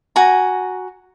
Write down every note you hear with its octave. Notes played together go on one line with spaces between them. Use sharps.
F#4 G#5 A#5